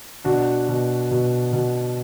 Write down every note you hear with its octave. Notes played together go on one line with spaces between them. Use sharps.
B2 D4 F#4
B2
B2
B2